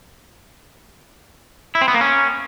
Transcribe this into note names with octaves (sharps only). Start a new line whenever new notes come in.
E4
C4
B3
A#3
C#4